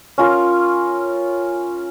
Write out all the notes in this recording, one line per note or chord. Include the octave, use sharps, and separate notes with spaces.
C#4 F4 A#4